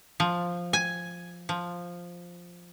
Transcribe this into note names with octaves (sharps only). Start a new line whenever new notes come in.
F3
G#5
F3